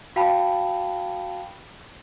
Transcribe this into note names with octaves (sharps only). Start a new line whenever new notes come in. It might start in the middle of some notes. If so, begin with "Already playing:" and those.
F#4 F5 G5 A5 B5